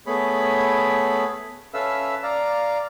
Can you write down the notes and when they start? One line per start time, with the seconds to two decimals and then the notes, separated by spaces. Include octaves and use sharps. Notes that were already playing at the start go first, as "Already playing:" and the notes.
0.07 A3 B3 G#4 C#5 B5
1.74 C#4 A4 B4 E5 F5 E6
2.23 D5 F5 A#5